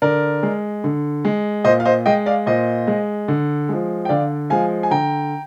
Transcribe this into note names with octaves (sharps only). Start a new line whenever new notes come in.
D3 A#4 D5
G#3
D3
G#3
A#2 C5 D#5
F5
C5 D#5
G#3 D#5 G5
D5 F5
A#2 C5 D#5
G#3
D3
F3 G#3
G5
D3 D5 F5
F3 G#3 F5 G#5
G#5
D3 G5 A#5